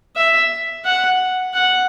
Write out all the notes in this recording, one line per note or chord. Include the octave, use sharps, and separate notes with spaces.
E5
F#5
F#5